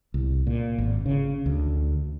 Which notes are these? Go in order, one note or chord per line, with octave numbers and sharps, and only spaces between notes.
C2
A#2
G#1
C#3
D2